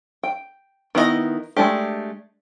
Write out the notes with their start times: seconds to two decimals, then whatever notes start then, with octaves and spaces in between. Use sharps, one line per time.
0.23 G5
0.95 D#3 B3 E4 F#4 D#5
1.57 G#3 A3 D4 G4